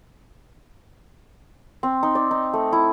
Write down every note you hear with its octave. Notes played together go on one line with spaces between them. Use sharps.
C4
D#4
D5
D#4
A3
E4